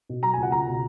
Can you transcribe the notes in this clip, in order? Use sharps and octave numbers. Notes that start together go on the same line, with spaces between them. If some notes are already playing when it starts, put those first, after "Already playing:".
B2
F#3 A#5
C#2 G#5
F#5
C#2 A#5
B2